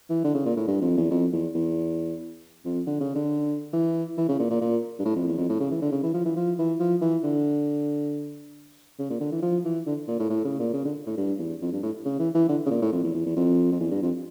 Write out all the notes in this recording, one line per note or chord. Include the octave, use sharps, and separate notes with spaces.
E3
D3
C#3
A#2
A2
G2
F2
E2
F2
E2
E2
F2
D3
C#3
D3
E3
E3
C#3
A#2
A#2
A#2
G2
A2
F2
E2
F2
A2
C#3
E3
D3
C#3
E3
F3
E3
F3
E3
F3
E3
D3
C#3
A#2
D3
E3
F3
E3
D3
A#2
A2
A2
C#3
A#2
C#3
D3
A2
G2
E2
F2
G2
A2
C#3
E3
E3
D3
C#3
A#2
A2
F2
E2
E2
E2
F2
F2
E2
G2
F2